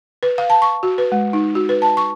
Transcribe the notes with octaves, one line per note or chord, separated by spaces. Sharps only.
B4
F5
A5
C#6
F#4
B4
G#3
D#4
F#4
B4
A5
C#6